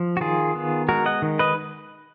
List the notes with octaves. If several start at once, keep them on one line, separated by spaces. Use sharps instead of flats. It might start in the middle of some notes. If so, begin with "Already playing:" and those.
Already playing: F3
F#4
D#3 F4 G#4
B3
G#3 F#4 A#4
D#5 F#5
D#3
B4 D#5